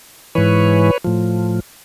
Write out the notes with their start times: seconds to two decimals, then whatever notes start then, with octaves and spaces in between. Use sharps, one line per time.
0.35 G#2 E3 B4 C#5
1.05 A2 F3